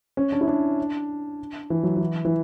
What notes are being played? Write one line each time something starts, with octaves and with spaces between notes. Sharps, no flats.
C#4
D4
E4
D4
E3
F#3
E3
E3